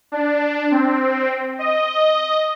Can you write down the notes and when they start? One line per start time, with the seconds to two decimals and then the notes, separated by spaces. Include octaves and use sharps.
0.12 D4
0.71 C4
1.59 D#5